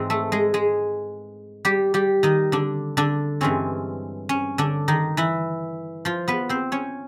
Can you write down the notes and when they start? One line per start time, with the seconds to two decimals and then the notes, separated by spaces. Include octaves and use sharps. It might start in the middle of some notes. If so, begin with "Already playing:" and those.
Already playing: G#2 E3 G#3 C4
0.10 A3 A4
0.32 G#3 G#4
0.54 G#3 G#4
1.65 G3 G4
1.94 G3 G4
2.23 D#3 D#4
2.52 D3 D4
2.97 D3 D4
3.41 G2 E3 G#3 C4 C#4
4.29 C#4
4.58 D3 D4
4.88 D#3 D#4
5.17 E3 E4
6.05 F3 F4
6.28 B3 B4
6.49 C4 C5
6.72 C#4 C#5